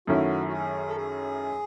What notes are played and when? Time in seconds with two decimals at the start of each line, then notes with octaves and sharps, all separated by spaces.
0.07 F#2 D#3 A3 C#4 E4 F#4
0.48 F#4
0.52 G#4
0.88 A4
0.97 G#4